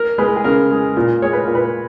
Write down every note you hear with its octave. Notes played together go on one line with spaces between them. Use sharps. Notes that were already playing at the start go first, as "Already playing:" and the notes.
Already playing: A#4
G#3 B4
G#4
C#3 A#4
G#3
A#2 A#4
G#3 C#5
B4
A#2 A#4
B4